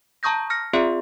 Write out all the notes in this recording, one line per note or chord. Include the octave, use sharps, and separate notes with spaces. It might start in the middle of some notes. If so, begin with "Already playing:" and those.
A5 A#5 C#6 D#6 G6 A#6
F6 A#6 C#7
C4 F4 G#4 D5 E5 C6